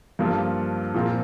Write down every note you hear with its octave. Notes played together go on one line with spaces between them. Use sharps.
G2 F3 A#3 F4 A4
A#2 F3 C4 F4 A#4